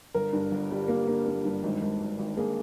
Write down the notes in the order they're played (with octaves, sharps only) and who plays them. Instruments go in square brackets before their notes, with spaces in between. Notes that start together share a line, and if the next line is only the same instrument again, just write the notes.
[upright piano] G1 A#4
G2
G1
G3
A#3
A#3
A#3
G2
G#1
G#1
G#1
G#1
A#3 G#4